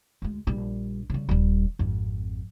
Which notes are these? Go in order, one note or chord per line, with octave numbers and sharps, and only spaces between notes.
D2 G#3
A#1 G3
C#3 G3
D#1 G3
G#1 F2